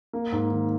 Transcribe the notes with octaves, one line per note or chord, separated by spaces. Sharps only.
A#3
G#2
D#3